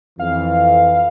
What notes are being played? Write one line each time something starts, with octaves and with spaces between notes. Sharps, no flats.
F2 E3 F5